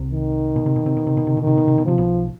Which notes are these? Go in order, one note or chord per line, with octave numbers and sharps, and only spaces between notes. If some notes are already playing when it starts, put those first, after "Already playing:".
Already playing: C2 C3
D#3
B2
C3
B2
C3
B2
C3
B2
C3
B2
C3 D#3
B2
C3
B2
C3 F3
B1 B2